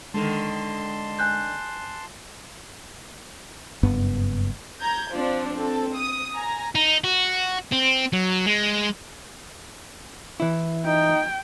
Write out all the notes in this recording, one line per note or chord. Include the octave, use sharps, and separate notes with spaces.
D3 D#3 G#3 A4 A5 C6 A#6
G#5 F#6 G6
F#1 G2 B3
A#5 G6 G#6
F3 C4 D4 D5
C4 A4
D#6
G#5 A#5
D#4
F#4
C4
F#3
G#3
E3 E4
D#4 G5